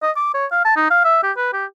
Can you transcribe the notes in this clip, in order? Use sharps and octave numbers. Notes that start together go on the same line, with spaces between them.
D#5
D6
C#5
F5
A5
D#4
F5
E5
G4
B4
G4